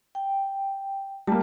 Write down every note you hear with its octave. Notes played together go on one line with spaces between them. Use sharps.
G5
G3 A#3 A5